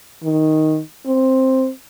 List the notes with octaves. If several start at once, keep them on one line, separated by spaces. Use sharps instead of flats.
D#3
C4